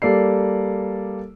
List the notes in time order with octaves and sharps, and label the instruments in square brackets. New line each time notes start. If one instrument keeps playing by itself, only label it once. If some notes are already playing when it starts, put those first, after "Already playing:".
[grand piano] G3 A#3 A4 D5 C7